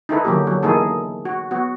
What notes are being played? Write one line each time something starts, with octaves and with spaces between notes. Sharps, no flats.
D#4 E4 A4 B4
D3 F#3 A#3 G4
F#3
E3 A#3 D#4 G#4 A4
F#4
B3 F#4